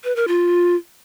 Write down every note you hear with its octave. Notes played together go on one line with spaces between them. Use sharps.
B4
A#4
F4